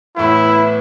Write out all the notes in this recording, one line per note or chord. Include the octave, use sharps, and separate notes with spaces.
A2 E3 B3 E4